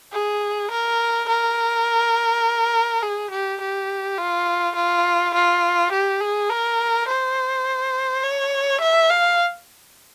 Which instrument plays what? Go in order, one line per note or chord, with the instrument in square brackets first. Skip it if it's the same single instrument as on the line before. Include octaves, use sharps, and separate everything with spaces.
[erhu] G#4
A#4
A#4
G#4
G4
G4
F4
F4
F4
G4
G#4
A#4
C5
C#5
E5
F5